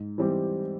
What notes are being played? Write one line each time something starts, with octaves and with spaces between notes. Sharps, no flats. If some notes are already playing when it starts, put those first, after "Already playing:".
Already playing: G#2
E3 G3 C4 G4